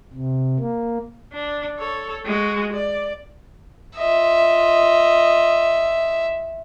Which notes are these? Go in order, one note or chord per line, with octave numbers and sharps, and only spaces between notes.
C3
A#3
D4
A4 C#5
G#3 F#4
D5
F4 D#5 E5